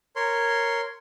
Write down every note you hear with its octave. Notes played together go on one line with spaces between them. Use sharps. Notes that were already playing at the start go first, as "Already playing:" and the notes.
A#4 C#5 C6